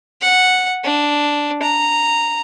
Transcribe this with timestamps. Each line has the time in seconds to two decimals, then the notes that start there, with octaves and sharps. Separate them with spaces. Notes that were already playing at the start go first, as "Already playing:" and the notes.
0.21 F#5
0.84 D4
1.62 A#5